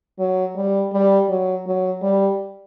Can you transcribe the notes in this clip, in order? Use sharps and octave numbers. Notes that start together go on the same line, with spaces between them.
F#3
G3
G3
F#3
F#3
G3